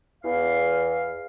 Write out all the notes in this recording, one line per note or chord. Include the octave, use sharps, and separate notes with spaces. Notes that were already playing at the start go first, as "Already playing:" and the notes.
E2 F5